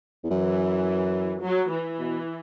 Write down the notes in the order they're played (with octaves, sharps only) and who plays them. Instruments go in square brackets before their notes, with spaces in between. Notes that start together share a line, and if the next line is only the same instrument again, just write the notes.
[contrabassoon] E2
[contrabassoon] F#2 [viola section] E3
[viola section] F#3
E3
[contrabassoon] B2